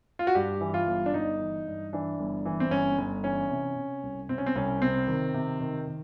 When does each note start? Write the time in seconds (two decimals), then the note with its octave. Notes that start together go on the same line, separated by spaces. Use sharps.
0.19 F4
0.27 F#4
0.35 G2 G4
0.61 E3
0.74 F4
0.87 G1
1.06 D4
1.14 G1 D#4
1.40 E3
1.67 G2
1.93 E3 D4
2.20 G1
2.45 E3
2.60 C4
2.71 G1 C#4
2.98 G1
3.23 E3 C#4
3.50 C3
3.76 C3
4.03 C2
4.29 C3 C4
4.38 C#4
4.46 C4
4.56 C2 C#4
4.81 C3 C4
5.08 D#3
5.34 C3
5.60 D#3
5.87 D#3